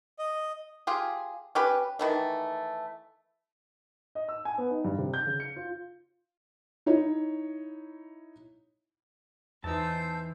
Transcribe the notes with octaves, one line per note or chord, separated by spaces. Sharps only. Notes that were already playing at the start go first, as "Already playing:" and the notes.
D#5
F4 G4 G#4
C#4 G4 B4
D#3 E3 A3
D#5
E6
G#5
B3
D#4
G2
C3
G6
C#3
C#7
F4
D#4 E4 C#5
E2 E3 D#4 C5 A5 E6 G6